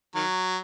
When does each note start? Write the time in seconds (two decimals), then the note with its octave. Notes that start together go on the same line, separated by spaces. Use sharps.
0.15 D#3 F#3